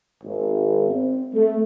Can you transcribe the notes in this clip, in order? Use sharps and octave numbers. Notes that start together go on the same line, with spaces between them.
G#1
C4
A3